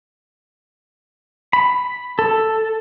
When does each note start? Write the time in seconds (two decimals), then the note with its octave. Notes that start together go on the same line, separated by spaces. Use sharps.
1.53 B5
2.19 A4